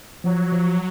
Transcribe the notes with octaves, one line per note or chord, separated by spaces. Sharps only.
F3 F#3
F3